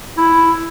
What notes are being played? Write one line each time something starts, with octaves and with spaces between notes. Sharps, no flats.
E4